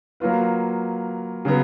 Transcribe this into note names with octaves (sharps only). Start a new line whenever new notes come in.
F#3 A#3 F4 B4
C#3 F#3 B3